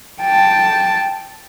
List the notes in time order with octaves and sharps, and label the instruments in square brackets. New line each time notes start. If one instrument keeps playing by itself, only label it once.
[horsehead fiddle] G5 A5